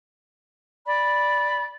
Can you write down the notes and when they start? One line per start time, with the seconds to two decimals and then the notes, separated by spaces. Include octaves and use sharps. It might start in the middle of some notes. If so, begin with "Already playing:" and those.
0.85 D5 B5